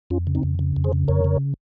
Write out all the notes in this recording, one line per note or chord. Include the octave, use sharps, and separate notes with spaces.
F2 C#4 F4
C#3
C4 D#4
F2
C#3
F2
G#4 C5
C#3
F2 A#4 C#5
C#3